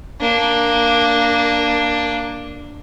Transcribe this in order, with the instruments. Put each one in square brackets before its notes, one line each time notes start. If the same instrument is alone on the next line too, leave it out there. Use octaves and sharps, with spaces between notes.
[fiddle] A#3 D4